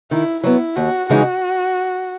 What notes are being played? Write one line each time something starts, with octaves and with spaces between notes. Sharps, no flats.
D#3 E4
F#3 B3 E4
D#2 F#4
C#3 E3 G#3 D#4 F#4